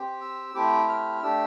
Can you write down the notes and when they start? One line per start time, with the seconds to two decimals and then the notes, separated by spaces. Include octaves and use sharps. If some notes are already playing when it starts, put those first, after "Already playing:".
Already playing: C4 G4
0.21 E6
0.54 A3 C4 E4 G4 D6
0.88 F6
1.22 A3 D4 G4 E6